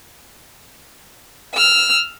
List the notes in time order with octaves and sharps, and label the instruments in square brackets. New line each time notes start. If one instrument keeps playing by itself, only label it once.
[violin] E6 F6